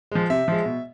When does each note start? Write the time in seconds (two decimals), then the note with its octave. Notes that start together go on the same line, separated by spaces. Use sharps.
0.12 F3 G#3
0.30 C3 E5
0.48 F3 G#3
0.65 B2